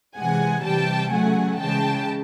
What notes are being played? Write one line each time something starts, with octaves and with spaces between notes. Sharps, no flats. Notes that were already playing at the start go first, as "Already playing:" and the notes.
C3 E3 G#3 F#5 G#5
C3 E3 G3 G5 A5
C#3 F#3 A3 F#5 G#5
C#3 E3 G#3 G5 A5